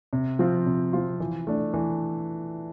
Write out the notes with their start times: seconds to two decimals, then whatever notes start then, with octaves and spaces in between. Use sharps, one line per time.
0.13 C3
0.39 F3 C4 F4
0.66 C3
0.93 F3 C4 F4
1.20 E3
1.47 A3 D4
1.74 E3